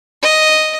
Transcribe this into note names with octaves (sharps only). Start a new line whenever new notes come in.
D#5